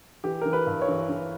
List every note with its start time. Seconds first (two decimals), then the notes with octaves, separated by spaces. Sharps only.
0.24 E3 G4
0.41 E3 A#4
0.53 B4
0.67 G2
0.81 C#5
0.88 E3
1.09 E3